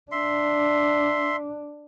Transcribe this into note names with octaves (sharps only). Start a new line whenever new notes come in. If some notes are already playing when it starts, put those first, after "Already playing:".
D4 E5 C6